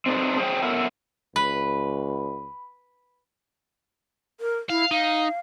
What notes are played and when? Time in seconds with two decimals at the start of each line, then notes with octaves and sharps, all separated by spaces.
0.06 C4 D4 D#4 A4 B4
0.38 G#4 C5 C#5 F5 G5
0.62 B3 E4 A4 A#4 C#5
1.36 C#2 B4 B5
4.40 A#4
4.70 E4 F5
4.91 D#4 F5